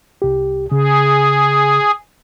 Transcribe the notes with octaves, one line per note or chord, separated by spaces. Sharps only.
C2 G4
C#3 G#4